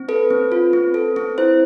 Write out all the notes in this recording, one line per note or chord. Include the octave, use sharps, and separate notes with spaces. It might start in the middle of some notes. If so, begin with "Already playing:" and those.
Already playing: C4
A4 B4
C4
F4
C4
A4
C4
E4 C5